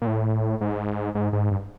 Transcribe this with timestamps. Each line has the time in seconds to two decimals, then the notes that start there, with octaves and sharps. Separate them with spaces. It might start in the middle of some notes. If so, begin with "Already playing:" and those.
0.02 A#2
0.07 A2
0.61 G#2
1.15 G#2
1.33 G#2
1.51 G2